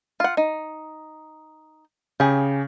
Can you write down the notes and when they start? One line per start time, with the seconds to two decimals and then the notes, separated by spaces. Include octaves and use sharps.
0.20 F4 F#5
0.37 D#4
2.20 C#3 G4 G#4